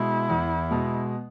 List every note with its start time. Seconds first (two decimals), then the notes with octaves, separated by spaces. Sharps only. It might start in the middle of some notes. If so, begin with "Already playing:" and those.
Already playing: B2 G#3 E4
0.29 E2
0.71 B2 G#3